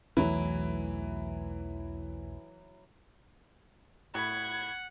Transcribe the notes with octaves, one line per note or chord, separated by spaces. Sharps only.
B1 E2 E3 F#3 A3 E4
A2 F#5 B5 G#6